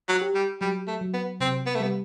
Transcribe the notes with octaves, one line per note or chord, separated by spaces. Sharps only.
F#3
G4
G3
F#3 G3
A3
F#3
B3
C3 C4
B3
A3
G3 B3